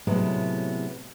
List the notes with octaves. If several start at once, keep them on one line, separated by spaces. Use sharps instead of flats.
A2 C3 F#3 G#3 B3 E4